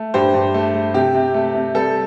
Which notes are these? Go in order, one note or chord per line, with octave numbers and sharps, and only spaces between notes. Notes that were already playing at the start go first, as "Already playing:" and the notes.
Already playing: A3
G2 G4 C5
G2
A3
A3
C3 G4
C3
A3
C3
G3 A4